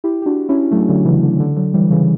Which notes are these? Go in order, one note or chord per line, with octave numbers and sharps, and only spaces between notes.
E4 G4
G4
D4 F#4
C#4 E4
F#3 A3
D3 F#3
C#3 E3
D3
D3
D3 F#3
E3 G3
C#3 E3